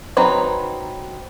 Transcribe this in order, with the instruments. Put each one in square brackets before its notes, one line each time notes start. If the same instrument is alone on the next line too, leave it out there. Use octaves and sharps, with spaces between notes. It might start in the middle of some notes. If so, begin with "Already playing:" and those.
[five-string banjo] F#3 C4 D#4 B4